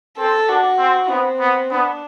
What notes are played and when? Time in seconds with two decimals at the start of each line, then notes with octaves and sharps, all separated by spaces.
0.18 C4 A4
0.48 D4 F#4
0.78 C4
1.09 B3 C4
1.40 B3
1.71 B3 D4